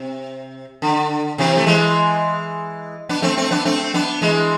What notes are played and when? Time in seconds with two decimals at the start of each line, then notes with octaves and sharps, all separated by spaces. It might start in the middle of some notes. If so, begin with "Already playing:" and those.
Already playing: C3
0.82 D3
1.38 C3 E3
1.57 A3
1.67 E3 G#3
3.09 B3 D4
3.22 A3 C4
3.37 A3 C4
3.51 B3 D4
3.65 A3 C4
3.94 B3 D4
4.22 E3 G#3